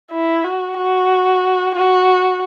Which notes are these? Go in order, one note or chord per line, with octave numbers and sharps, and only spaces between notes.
E4
F#4
F#4
F#4